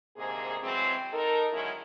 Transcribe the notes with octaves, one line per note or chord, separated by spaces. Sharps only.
D2 G#2 C3 A#3 G#4
C#3 E3 F#3 G#3 C4
D#4 A4 A#4
D3 D#3 F#3 G#3 C#4 E4